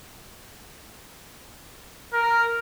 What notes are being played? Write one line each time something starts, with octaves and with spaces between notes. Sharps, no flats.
A#4